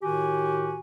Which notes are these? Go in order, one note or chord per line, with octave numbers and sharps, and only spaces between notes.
A2 D#3 F#4 G4 G#5